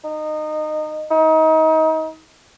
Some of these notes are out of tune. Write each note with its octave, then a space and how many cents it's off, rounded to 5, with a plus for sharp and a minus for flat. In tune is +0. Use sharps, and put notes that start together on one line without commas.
D#4 -20
D#4 +30